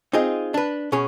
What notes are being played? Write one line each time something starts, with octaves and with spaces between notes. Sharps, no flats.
C4 D#4 F4 G#4 D#5
D4 B4
B2 C#4 G#4